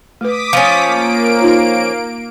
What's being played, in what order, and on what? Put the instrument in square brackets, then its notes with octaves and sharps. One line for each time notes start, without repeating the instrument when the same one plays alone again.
[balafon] A3 B4 [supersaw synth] D6 D#6 B6
[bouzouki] F3 C#4
[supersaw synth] A#3 D7
[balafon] D#4 F4 C#5